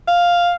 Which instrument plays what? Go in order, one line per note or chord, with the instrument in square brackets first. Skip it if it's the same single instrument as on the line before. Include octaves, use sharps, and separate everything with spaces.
[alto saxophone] F5